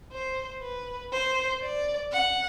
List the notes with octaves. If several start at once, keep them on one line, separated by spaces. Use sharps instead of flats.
C5
B4
C5
D5
F#5